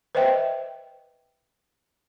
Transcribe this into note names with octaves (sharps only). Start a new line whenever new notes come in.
B4 C5 D#5 E5 G5